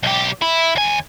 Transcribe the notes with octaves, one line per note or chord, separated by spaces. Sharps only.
B1 G4
E4
D#2 G#5